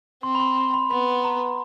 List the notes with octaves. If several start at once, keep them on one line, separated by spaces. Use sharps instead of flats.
C4 C6
B5
C6
C6
B5
B3 B5
A#5